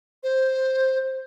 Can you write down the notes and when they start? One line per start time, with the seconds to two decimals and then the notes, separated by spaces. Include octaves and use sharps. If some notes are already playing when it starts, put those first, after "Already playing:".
0.23 C5